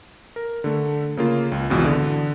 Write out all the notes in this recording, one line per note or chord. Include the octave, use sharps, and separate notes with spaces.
A#4
D3 A3
C#3 A#3 F4
C#2
G#1 C#2 B2 E3
D3